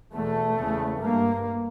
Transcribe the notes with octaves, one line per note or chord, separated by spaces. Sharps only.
E2 B2 A3
E2 C#3
G2 A#3